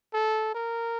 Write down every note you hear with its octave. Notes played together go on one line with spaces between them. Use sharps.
A4
A#4